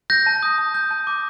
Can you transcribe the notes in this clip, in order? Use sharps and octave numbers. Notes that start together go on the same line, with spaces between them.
G6 A#6
A5
D#6
A5
G6
A5
D6